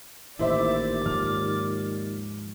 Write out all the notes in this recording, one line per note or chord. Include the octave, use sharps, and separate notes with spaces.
A1 D#2 A#2 E4 C5 D5 E5 D6
G#2 F3 G#3 F6